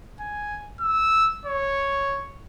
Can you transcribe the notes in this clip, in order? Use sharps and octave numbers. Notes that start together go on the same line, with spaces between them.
G#5
E6
C#5